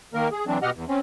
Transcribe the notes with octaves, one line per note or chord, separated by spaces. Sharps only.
D#3 A#3 A#4
G#4
E3 F#3 C4 D4
B2 G4 D#5 F#5 F6
E2
C4 C#4